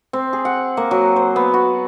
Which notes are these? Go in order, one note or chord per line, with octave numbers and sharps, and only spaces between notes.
C4
G#4
F#5
A#3
F#3
C5
B3
F#4